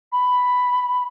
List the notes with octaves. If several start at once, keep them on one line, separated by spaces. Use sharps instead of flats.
B5